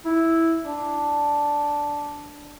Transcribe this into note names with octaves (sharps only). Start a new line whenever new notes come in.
E4
D4